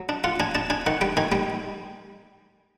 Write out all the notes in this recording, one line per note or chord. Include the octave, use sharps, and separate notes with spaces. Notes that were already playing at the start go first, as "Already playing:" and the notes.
Already playing: F#3
D4
F4 F#5
D4 G#5
D4 A5
D4 G#5
D#3 F#5
G3 G5
D#3 G#5
G3 G5